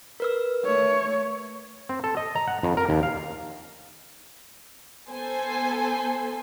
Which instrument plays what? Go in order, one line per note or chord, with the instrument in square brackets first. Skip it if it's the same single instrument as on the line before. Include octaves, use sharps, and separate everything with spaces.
[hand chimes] A#4 B4 E6
[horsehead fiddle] A3 C#5
[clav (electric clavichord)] C4
A4
D#5
A#5
F#5
F2
A#4
D#2
F5
[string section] B3 A4 C5 G#5